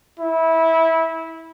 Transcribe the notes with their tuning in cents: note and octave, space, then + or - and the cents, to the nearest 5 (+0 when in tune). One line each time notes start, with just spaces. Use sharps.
E4 -20